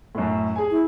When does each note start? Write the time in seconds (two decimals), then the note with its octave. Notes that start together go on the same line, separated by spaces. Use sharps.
0.15 F#2 A2
0.56 G#4 G#5
0.71 E4